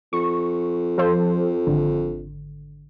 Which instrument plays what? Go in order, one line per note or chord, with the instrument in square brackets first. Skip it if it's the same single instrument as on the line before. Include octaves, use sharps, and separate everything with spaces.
[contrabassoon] F2 [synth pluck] C#6
[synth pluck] F3 A4 C5
G#1 D3